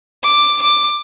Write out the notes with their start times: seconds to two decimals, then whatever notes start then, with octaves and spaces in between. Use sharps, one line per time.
0.24 D6
0.62 D6